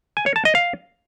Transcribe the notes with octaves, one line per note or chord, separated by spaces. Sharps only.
G#5
C#5
A5
D#5
F5